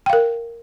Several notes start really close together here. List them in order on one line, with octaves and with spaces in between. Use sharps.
G5 F5 A#4